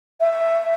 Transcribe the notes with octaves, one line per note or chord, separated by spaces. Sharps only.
E5